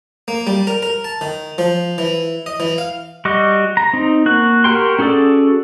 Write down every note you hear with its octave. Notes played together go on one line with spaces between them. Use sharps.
A#3
G3
A#4
A#4
A5
D#3
F3
E3
D#5
E3
F5
G3 F#4 D#5 D6
A#5
C4 D#4
A#3 F#4 F#6
F#4 G4 A#4 G5 C6
C#4 F#4 G#4 A4 D5